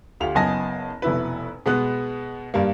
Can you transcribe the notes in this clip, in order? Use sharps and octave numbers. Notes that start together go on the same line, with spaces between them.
D2 F4 G4 F7
F#1 B3 D#5 G#5 A5 A#6
F1 B2 E4 B4
B2 G#3 B3 F#6
G2 G3 A#3